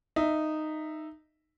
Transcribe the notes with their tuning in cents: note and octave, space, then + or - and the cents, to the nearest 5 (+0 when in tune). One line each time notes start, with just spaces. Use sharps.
D#4 -10 E5 +0